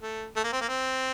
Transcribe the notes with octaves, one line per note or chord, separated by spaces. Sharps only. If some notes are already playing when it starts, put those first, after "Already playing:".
A3
A3
A#3
C4
A#3
C4